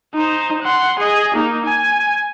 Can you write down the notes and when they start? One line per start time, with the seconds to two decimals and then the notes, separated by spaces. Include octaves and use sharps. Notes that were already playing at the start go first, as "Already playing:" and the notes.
0.14 D#4 C5
0.62 F#5 C6
0.99 G#4 D#5
1.34 A#3 D#4
1.65 G#5